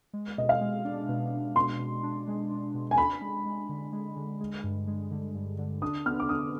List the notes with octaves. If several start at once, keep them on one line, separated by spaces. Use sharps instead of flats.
G#3
B2 D#5
F5
G#3
D4
B2
B2
B2 C6
B2
D4
G#3
D4
B2
G#5
D4 B5
G#3
G#3
D3
G#3
D3
G#3
G2
G#3
D3
G2
D3
D4 D#6
B3 F6
D6
D4 D#6